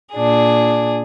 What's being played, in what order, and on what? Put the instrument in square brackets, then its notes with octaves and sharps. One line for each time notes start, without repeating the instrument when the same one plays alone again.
[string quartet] A#2 D4 G#4